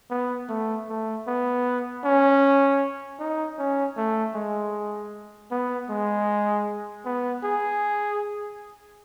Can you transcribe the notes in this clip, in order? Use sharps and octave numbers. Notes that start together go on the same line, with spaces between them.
B3
A3
A3
B3
C#4
D#4
C#4
A3
G#3
B3
G#3
B3
G#4